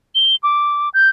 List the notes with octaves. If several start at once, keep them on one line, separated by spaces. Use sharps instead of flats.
G7
D6
G6